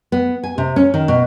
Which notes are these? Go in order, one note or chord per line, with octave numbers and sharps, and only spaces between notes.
B3
G#5
C3
C#4
D#3
B2